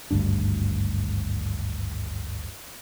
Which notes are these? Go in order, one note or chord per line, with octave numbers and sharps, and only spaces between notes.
G#1 D2 G2 D4